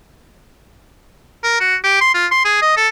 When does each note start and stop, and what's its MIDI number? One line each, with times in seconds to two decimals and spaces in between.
1.44 1.59 70
1.60 1.76 66
1.84 1.96 67
2.01 2.10 84
2.14 2.26 65
2.31 2.42 84
2.45 2.58 68
2.62 2.75 75
2.77 2.88 69